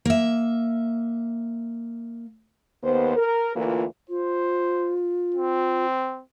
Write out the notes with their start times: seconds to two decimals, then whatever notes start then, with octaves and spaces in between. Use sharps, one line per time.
0.05 A#3 E5
2.84 D#2 B3 C5
3.16 A#4
3.56 D2 E3 A#3 F4
4.09 F4 C5
5.34 C4